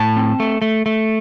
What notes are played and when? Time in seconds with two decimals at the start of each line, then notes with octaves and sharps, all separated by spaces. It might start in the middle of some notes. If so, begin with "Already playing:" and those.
Already playing: A2 A5
0.16 C4
0.40 A3
0.62 A3
0.86 A3